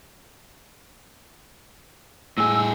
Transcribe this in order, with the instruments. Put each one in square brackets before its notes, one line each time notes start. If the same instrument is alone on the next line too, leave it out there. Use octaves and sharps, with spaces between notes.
[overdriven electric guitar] A2 G#4 [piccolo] E6